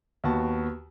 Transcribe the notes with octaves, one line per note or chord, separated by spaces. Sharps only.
D#2 B3 F#4 A5